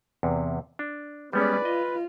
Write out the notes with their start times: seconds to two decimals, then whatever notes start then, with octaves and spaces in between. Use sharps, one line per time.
0.23 E2 C3
0.79 D4
1.33 G3 G#3 B3 C#4 B4 D5
1.65 F4 D#5